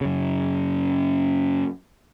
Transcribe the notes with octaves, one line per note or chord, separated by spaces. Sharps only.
F#2 C#3